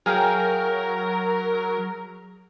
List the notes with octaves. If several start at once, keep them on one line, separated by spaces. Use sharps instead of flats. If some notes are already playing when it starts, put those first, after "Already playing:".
F#3 G#4 A#4 F5 G5